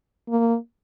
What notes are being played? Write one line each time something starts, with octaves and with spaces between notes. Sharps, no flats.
A#3